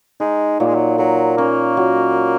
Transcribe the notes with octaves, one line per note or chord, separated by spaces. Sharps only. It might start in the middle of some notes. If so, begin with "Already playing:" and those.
G#3 D#4
A#2 F#3
G#3
F#3
F#3 A#4
A#3 C#4
F#3